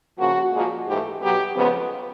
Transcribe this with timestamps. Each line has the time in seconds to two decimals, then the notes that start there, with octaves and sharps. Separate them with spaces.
0.18 C#3 F3 A#3 F#4
0.53 A#2 F3 G#3
0.87 G#2 E3 A3 G4
1.21 B2 F#3 B3 G4
1.55 F2 C#3 F3 G#3 B3